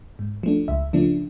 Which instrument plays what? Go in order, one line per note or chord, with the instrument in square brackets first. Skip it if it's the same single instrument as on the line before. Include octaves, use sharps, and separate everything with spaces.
[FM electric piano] G#2
F3 A3 D4
C#2 E5
C#3 F3 A3 D4